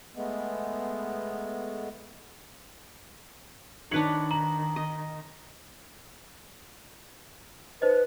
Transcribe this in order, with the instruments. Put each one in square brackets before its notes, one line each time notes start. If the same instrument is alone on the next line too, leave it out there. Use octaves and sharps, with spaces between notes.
[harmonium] G#3 A3 B3
[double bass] D#3 [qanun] D4 B4 C#5 [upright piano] D#4 C#7 F#7
[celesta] A#5 [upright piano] F#7
[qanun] D#5
[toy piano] D#4 C5 D#5 [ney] B4